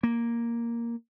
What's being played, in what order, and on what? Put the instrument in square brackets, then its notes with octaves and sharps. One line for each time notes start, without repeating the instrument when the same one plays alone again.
[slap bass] A#3